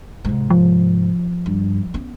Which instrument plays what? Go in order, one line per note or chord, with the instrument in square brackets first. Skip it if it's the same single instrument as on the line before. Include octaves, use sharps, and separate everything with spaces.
[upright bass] G#2 C3
[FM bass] F3
[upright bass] G2
B3 C#4